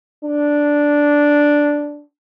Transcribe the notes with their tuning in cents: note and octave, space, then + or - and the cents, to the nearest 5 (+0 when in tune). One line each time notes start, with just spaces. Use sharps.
D4 -5